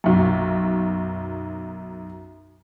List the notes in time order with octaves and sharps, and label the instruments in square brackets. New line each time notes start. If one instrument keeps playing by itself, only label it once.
[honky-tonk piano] B1 F#2